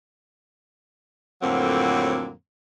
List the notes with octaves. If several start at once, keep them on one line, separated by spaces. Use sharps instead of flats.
F2 A2 D3 F#3 A#3 C4